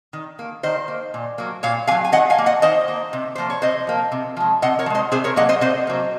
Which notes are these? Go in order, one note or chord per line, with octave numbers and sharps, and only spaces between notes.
D#3
A#3
D#3 C5 D#5
A#3
A#2
F#3 A#3
A#2 C#5 F5
A#3 F5 G#5
F#3
G#5
D#3 D#5 F#5
F5 G#5
A#3
D#5 F#5
D#3 C5 D#5
A#3
C3
F3 A#3 C5
C#5
C3 C5 D#5
F3 A#3
C3
F3 G#3
C3 D#5 F#5
A#4 C#5
F3
G#3 C5 D#5
C3 G#4 C5
A#4 C#5
F#3 A#3 D#5 F#5
C5 D#5
C3 C5 D#5
F#3 A#3